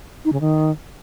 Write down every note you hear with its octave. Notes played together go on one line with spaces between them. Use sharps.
D#4
C#3
D#3